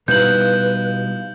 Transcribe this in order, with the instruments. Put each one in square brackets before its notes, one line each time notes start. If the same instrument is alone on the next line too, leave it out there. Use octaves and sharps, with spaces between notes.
[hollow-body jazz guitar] B2 G3 D#4 [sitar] F3 E4 [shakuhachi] B4 [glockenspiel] G6 F#7